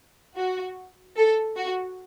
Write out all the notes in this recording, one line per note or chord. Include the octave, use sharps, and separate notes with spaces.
F#4
A4
F#4